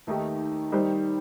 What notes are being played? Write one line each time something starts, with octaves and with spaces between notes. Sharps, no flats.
D#2 D#3 A3 D#4 G4
D#3 G3 D#4 G4 C5